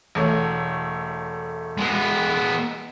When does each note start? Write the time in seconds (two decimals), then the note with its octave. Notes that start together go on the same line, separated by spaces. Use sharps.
0.15 E1 A3 C#5
1.78 G#3 B3